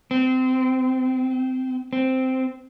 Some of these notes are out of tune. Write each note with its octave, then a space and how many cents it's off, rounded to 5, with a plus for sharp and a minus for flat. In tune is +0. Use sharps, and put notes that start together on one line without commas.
C4 -25
C4 -5